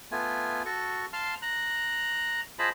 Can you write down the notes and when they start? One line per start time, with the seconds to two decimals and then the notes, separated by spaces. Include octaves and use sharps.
0.12 A3 B3 F4 G#5
0.65 F#4 A4 C#6
1.13 F5 A5 C6 F6
1.42 A#5 F#6
2.59 F4 G#4 C5 D#5 A5 B5